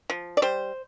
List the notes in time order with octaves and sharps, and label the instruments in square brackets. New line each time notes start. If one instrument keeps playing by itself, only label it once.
[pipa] F3
D5
G3 C5